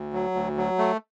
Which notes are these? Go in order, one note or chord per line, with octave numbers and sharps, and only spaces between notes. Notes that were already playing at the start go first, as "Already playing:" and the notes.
Already playing: D2
F#3
D2
F#3
A3